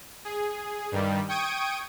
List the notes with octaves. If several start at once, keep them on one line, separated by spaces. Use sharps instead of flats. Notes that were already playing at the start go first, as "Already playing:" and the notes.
G#4
G2 D#3 G3
G5 C#6 D#6 G#6 D7 D#7